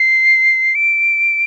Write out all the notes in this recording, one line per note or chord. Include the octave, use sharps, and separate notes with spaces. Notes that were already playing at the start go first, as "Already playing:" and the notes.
Already playing: C7
D7